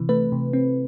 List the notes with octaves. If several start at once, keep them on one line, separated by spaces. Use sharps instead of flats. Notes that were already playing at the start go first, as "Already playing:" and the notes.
Already playing: C3 E3
A3 B4
C3
C4